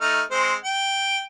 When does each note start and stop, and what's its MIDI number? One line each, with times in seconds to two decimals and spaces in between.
0.01 0.22 57
0.01 0.22 63
0.01 0.22 89
0.31 0.55 56
0.31 0.55 60
0.31 0.55 72
0.64 1.22 79